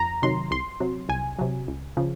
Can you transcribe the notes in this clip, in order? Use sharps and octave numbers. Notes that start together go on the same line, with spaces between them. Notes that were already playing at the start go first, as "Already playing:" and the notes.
Already playing: F2 A#5
C3 D#3 F#3 C6
C2 C6
C3 F#3
C2 G#5
C3 F#3
C#2
C#3 F3